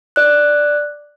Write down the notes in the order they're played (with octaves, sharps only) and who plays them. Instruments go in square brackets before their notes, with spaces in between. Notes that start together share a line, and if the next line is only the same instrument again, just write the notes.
[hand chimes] D5 F#6